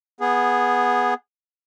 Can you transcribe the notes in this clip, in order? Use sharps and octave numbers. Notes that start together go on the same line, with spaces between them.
B3 G#4